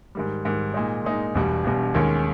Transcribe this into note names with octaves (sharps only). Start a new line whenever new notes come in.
G#2 D#3 G3
G#2 D#3 G3
A#2 G#3 D#4
A#2 G#3 D#4
E1 E2 B2 G3
E1 E2 B2 G3
D#2 D#3 G#3 C#4